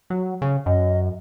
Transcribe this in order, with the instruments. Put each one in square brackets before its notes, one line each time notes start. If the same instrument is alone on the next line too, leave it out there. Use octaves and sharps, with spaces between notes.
[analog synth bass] F#3
C#3
[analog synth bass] F#2 [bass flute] D#5